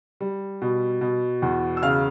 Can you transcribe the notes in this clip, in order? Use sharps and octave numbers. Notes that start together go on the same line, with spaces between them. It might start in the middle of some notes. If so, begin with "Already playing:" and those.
G3
B2
B2
E2
E6
C#3 F5 F6